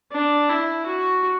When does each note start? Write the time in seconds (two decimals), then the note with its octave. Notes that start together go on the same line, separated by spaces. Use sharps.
0.12 D4
0.50 E4
0.86 F#4